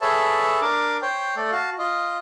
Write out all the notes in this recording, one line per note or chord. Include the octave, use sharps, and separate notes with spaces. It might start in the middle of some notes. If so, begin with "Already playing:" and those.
G#4 A4 B4 C#5 E5 A5
D4 A#4 D6
C5 C#5 G5
A3 A4 D5
F#4 F5 A5
F4 D#5